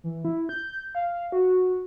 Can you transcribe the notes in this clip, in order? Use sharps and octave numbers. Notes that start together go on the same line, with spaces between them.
E3
E4
G6
F5
F#4